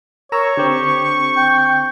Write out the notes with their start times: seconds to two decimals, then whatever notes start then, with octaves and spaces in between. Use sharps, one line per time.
0.32 A#4 C#5 A#5 C#6 E6
0.57 D3 C4 G4
1.37 G5